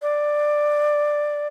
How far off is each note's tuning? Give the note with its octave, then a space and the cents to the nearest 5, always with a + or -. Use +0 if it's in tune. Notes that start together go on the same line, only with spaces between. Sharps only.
D5 +10